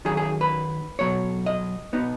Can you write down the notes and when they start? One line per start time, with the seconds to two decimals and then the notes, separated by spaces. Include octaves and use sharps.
0.05 F#2 D#3 F#3 G#4
0.17 G#4
0.41 B4
0.99 B1 B2 F#3 C#5
1.46 D#5
1.93 B2 B3 D#4